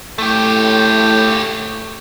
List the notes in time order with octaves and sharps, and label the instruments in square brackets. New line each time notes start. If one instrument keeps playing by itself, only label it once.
[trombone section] A2 [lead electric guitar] A3 G4